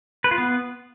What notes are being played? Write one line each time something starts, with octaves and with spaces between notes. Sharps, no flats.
B4
F4
B3